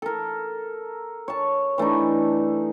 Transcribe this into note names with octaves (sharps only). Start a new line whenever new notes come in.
A4 A#4
C#5 A5
E3 A3 D4 D#4